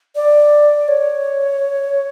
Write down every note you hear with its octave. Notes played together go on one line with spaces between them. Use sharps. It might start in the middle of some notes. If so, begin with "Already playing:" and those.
D5
C#5